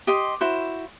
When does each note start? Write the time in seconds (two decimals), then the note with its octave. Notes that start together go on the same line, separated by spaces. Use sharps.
0.07 G4 D#5 C6
0.41 E4 F#4 C5